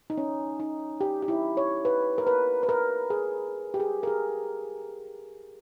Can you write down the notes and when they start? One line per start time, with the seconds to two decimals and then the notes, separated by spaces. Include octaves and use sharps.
0.10 D#4
0.18 C#4
0.60 D#4
1.01 G4
1.22 G4
1.28 E4
1.57 C#5
1.85 B4
2.18 A#4
2.27 B4
2.63 B4
2.69 A#4
3.10 G#4
3.74 G4
3.80 G#4
4.03 A#4
4.07 G#4